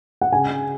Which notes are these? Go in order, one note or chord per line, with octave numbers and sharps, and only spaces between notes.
F#5
C#3 G#5